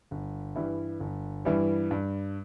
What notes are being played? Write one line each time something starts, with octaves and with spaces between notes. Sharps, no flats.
G1
G2 E3 G3 E4
G1
G2 E3 G3 E4
G2